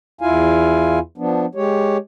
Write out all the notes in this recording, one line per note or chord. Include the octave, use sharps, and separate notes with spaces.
E2 E4 F4 F5 G#5
F3 B3 D4
G#3 G4 C#5